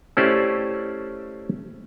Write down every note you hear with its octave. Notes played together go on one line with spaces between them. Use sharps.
A3 C#4 E4 G4 C5 D5